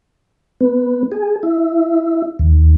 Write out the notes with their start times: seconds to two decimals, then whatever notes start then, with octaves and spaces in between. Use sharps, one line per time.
0.61 B3
1.12 G#4
1.43 E4
2.39 D#2